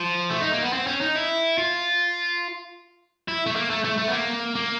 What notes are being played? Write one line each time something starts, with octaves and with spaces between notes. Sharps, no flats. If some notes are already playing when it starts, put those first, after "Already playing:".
Already playing: F3
A3
D#4
A#3
B3
C4
C#4
D#4
E4
F4
E4
A3
A#3
A3
A3
A3
B3
A#3
A#3